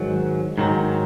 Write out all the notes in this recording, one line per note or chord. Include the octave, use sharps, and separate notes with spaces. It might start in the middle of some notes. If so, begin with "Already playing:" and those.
Already playing: G#2 D#3 F#3
G#2 D#3 F#3